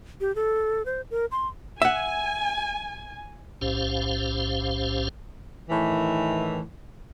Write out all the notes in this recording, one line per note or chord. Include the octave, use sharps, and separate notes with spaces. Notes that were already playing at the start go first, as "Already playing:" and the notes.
G4
A4
C5
A#4
C6
E5 F#5 G#5
B1 A2 C#4 G4 C5 F5
A2 D#3 E3